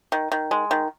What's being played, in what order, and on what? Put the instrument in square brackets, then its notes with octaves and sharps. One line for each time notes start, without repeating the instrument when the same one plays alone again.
[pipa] D#3
D#3
G#3
D#3